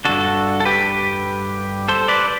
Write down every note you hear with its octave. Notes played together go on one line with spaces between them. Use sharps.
G2 D3 F#4 A4
A4
G4 B4
A4 C5
B4 D5